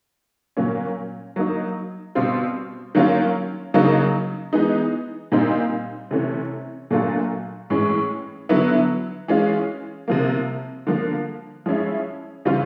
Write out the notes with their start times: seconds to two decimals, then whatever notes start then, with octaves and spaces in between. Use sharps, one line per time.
0.57 A#2 F#3 A#3 C#4
1.36 F#3 A#3 D#4
2.15 B2 G3 C4 F4
2.95 D#3 F#3 A#3 C#4 F4
3.74 C#3 F#3 A#3 D#4
4.53 E3 G#3 B3 D#4
5.32 A#2 G3 C4 D#4
6.11 C3 E3 A3 C#4
6.91 A#2 F#3 A3 D4 F4
7.70 A2 E3 G#3 C#4
8.49 D3 F#3 B3 E4
9.28 E3 G#3 C#4 F4
10.08 C3 F3 A#3
10.87 D3 F3 A#3
11.66 F3 G#3 C#4 E4
12.45 C#3 E3 G3 C4 F4